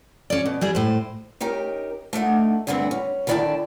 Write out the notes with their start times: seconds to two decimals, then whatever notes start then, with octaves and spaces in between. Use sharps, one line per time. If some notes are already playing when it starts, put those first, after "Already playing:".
0.30 C#4 D5
0.45 B2
0.61 E3 G3 G#4
0.75 A2 C5
1.41 C#4 D#4 G4 A#4
2.13 A3 D4 D#4 F#5
2.67 D2 G2 D3 B3 C4 D4
2.91 C#4
3.27 D3 D#3 E4 D5 G5 A5